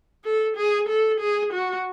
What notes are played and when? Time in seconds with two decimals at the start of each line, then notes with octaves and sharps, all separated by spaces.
0.24 A4
0.57 G#4
0.89 A4
1.20 G#4
1.53 F#4